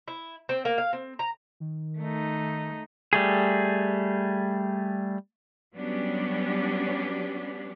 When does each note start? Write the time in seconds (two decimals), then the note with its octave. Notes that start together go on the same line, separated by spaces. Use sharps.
0.08 E4
0.49 C4
0.65 A#3
0.78 F5
0.93 C4
1.19 A#5
1.60 D#3
2.00 A3 D#4
3.13 G3 A3 G#4
5.74 F#3 G3 B3 C#4 D4 G4